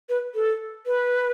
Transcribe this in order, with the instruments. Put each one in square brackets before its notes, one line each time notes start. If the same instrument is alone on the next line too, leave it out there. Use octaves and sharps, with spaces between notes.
[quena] B4
A4
B4